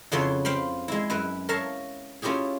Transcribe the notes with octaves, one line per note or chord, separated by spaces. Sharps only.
F2 C#3 B3 E4 C#5 C6
C5 F5 G5 B5
G#3 E4
F#2 E4 B4
A#4 C#5 E5 F5 A5
C#4 E4 F4 G4 G#4